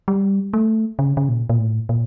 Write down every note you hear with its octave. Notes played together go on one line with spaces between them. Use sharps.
G3
A3
C#3
C#3
A#2
A#2
A2
A#2